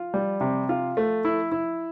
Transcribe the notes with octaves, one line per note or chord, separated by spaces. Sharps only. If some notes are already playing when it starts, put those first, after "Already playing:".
Already playing: F4
G3
C3
F4
A3
E4
E4